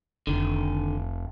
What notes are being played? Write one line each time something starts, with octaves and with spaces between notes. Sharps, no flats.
F1 D3 D#3